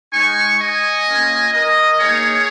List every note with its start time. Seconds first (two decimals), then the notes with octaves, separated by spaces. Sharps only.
0.12 G#3 D#4 G#5 C#6
0.60 D#5 G#5
1.07 A#3 C#4 F4
1.53 A#4 D#5
1.99 A#3 D#4 G#4 C#5